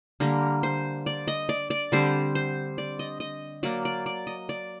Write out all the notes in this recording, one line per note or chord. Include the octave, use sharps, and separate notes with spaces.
D3 G3 A#3 A#4
C5
D5
D#5
D5
D5
D3 G3 C4 C5
C5
D5
D#5
D#5
F#3 A#3 D5
D5
D5
D#5
D5